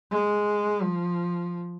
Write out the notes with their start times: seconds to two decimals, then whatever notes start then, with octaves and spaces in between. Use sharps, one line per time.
0.11 G#3
0.83 F3